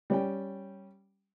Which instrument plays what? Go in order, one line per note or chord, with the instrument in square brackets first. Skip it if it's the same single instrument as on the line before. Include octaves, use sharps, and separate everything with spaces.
[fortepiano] G3 C#4 G5